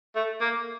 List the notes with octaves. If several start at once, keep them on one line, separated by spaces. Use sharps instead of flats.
A3
A#3